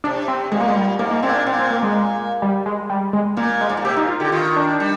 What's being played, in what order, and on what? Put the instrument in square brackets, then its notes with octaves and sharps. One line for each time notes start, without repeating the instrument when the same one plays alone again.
[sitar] C3 [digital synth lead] D4
[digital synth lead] C4
[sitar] A#2 [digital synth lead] G#3
[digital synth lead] A#3
G#3
G3
[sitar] G#2 [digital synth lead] A#3
[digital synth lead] A#3
[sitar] A#2 [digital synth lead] C4
[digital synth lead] D4
[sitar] A#2 [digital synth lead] C4
[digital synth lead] C4
A#3
G#3
G3
G#3
G3
G#3
[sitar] A#2 [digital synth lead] A#3
[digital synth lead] G#3
[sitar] G#2
A#2
[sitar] C3 [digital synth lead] G4
[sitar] A#2 [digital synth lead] D#4
[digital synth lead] F4
[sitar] D3 [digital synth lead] G4
[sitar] D#3 [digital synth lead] F4
[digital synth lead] D4
[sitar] G3